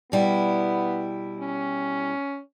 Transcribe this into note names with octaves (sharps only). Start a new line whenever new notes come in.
B2 G3 B3 E4
C#4